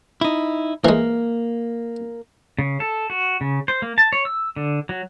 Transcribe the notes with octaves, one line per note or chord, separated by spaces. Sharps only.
D#4 E4
E3 G#3 A#3
C#3
A4
F#4
C#3
C5
A#3
A5
C#5
E6
D3
F#3